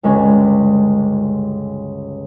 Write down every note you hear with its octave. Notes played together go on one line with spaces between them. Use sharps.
G1 C#2 G#3 C#4 F#4